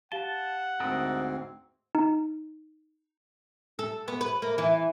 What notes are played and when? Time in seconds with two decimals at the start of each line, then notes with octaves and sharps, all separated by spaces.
0.12 G4 F5 F#5 A5 G7
0.80 D2 G#2 C4 A4 A#4 D#5
1.95 D#4
3.79 A4
4.08 B3
4.21 B4
4.42 A#3
4.58 E3